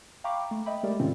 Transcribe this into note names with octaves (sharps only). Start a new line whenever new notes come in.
F5 G5 A#5 B5 C#6 D6
A3
D#5 E5 G5 B5
G#3 A3 G4 A#4 D5
G#2 C3 D#3 C4 C#4 F4